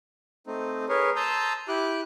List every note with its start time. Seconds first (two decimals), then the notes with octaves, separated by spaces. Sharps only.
0.47 A3 C4 D#4
0.89 G#4 A#4 B4 C#5
1.16 A5 A#5 C6 D#6 E6 G6
1.68 E4 G4 D6 F#6